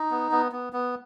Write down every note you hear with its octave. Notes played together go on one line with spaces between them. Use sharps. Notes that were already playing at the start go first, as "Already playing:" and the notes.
Already playing: D#4
B3
B3
B3
B3